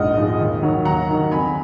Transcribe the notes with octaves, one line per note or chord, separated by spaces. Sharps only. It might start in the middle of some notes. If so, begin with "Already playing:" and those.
Already playing: A#1 G#2 F3 G#3 D#5 F#5 D#6 F6
G#2 F3 G#3
D#2
D#3 F#3
D#2 F#5 A#5
D#3 F#3
F2 G#5 B5